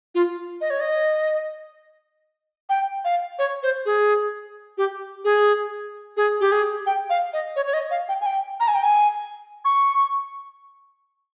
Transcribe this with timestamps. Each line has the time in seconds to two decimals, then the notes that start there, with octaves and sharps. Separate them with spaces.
0.15 F4
0.61 D#5
0.70 C#5
0.80 D#5
2.69 G5
3.05 F5
3.39 C#5
3.63 C5
3.86 G#4
4.78 G4
5.25 G#4
6.17 G#4
6.41 G4
6.52 G#4
6.86 G5
7.10 F5
7.33 D#5
7.56 C#5
7.66 C#5
7.74 D#5
7.91 F5
8.09 G5
8.21 G#5
8.26 G5
8.60 A#5
8.68 G#5
8.75 G5
8.83 G#5
9.65 C#6